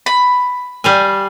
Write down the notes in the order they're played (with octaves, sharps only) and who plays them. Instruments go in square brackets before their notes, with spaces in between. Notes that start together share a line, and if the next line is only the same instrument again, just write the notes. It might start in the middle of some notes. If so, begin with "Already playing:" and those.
[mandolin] B5
[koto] G3 F5 G#5